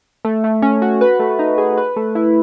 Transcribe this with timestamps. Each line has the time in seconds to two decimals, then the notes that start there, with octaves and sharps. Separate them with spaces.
0.25 A3
0.44 A3
0.62 C#4
0.82 F#4
1.01 B4
1.19 A3
1.39 D#4
1.58 G#4
1.77 B4
1.96 A3
2.15 E4